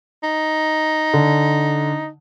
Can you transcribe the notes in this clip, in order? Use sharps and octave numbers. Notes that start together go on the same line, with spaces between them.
D#4
D3